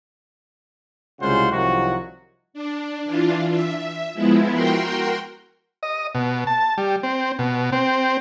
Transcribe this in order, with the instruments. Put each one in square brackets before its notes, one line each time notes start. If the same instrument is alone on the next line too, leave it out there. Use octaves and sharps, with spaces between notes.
[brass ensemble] C2 C#3 G#3 F4 C5 F#5
C2 D#3 F3 F#3 F#4
[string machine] D4
E3 D4 F4
E5
F3 G#3 B3 E4
F#4 A#4 G5 C6
[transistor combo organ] D#5
B2
A5
G3
C4
B2
C4